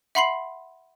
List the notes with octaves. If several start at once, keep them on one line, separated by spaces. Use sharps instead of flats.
E5 F#5 B5 C6 C7 F#7